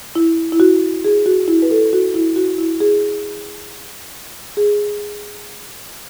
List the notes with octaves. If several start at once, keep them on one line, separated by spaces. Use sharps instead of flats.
E4
E4
F#4
G#4
F#4
E4
B4
A4
F#4
E4
F#4
E4
G#4
G#4